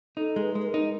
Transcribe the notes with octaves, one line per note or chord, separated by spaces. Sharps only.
D#4 A4
G#3
B4
G#3
B4
A#4
D#4